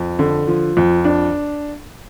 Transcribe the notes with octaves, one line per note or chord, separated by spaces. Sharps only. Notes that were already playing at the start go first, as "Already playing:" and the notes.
Already playing: F2
D3
F3
F2
D4